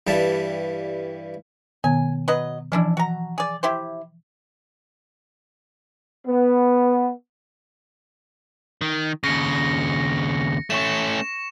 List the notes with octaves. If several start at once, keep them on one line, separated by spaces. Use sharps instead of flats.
G2 E3 G3 A5
B2 D#3 B3 G#5
F#3 B4 D#5
E3 F3 C#4 D4 E4
F#4 A#5
G#4 D5
E4 G4 C5
B3
D#3
D#2 C#3 A#6 C#7
A3 C#4 C#6 E7